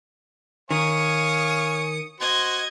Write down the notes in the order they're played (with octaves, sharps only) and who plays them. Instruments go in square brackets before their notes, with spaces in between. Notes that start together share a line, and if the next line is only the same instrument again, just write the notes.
[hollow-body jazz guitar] D#3 [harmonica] C#5 F5 G#5 [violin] D#6 C#7
[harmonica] F#4 C5 [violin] D#5 G#6